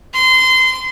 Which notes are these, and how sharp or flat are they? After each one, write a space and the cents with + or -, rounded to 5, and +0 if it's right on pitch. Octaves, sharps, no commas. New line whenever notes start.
C6 -25